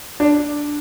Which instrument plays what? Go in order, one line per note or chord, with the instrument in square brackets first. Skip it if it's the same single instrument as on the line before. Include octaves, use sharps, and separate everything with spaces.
[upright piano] D4